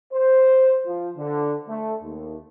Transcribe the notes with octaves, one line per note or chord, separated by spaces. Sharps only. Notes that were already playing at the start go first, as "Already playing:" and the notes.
C5
F3
D3
A3
D#2